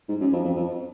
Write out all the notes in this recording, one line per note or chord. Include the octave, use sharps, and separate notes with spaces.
G#2
F#2
F2
F2
F2